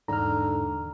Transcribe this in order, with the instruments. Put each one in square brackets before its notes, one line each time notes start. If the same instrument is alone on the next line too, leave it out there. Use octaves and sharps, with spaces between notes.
[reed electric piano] E2 A#5 [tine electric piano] G#2 F6 [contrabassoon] D3